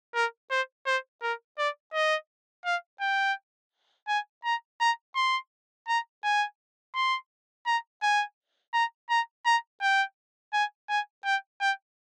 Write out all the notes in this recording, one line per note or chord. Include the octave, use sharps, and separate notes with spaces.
A#4
C5
C5
A#4
D5
D#5
F5
G5
G#5
A#5
A#5
C6
A#5
G#5
C6
A#5
G#5
A#5
A#5
A#5
G5
G#5
G#5
G5
G5